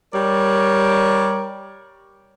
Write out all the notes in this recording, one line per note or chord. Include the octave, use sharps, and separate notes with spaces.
G3 A#4 C#5 D5